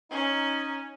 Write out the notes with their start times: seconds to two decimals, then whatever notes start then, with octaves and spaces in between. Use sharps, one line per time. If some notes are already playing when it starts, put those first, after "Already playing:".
0.11 C#4 D#4